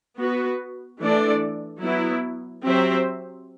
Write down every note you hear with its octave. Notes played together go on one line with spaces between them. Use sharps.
B3 F#4 B4
E3 A3 D4 A4 D5
F#3 B3 E4
F#3 C4 G4 C5 E5